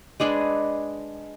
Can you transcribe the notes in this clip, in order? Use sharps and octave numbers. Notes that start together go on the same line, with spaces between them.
G#3 D4 G#4 B4